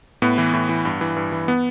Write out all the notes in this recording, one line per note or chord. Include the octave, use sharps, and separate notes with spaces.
A2 B3
E3
A2
E3
G2
E3
G2
E3
B3